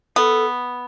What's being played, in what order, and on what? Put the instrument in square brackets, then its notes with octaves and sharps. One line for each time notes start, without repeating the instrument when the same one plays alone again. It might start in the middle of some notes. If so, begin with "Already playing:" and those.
[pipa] B3 [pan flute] A4